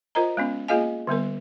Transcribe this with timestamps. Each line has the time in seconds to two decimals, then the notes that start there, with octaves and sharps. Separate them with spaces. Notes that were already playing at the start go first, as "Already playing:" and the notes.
0.15 F4 A#4 C5 D#5 A#5
0.37 G#3 B3 C#4
0.68 A#3 F4 G#4 D#5 F5 G#5
1.07 D3 G3 B3 A#4